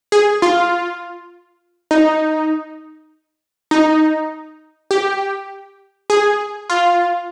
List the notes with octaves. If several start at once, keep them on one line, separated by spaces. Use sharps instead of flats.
G#4
F4
D#4
D#4
G4
G#4
F4